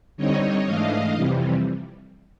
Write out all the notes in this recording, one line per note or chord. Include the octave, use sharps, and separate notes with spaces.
D3 G3 C4 D#4 C#5 D#5
G#2 E3 A3 D4 D#5 F5
F2 C3 E3 G3